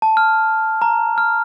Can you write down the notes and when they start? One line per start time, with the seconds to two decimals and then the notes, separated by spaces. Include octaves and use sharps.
0.02 A5
0.17 F6
0.82 A#5
1.18 F6